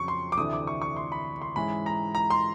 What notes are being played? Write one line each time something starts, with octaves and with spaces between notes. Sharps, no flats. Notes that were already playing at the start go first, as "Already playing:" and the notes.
Already playing: F2 C#3 F#3 C#6
C6
D6
D2 C3 E3 A3 D4 D#6
D6
C#6
C#6
C6
B5
C6
G#2 E3 G#3 C#4 E4 B5
A#5
A#5
C6